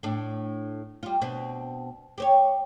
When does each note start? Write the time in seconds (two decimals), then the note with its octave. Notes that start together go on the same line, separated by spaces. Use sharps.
0.03 A2 D4
1.03 G3 F4
1.21 B2 C4 D4
2.18 G4 C5 C#5